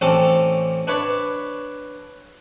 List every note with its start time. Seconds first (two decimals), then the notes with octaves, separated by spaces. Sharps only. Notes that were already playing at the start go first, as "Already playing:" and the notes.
0.01 A1 C4 C#4 A4 D5
0.87 D4 B4 C#5 D5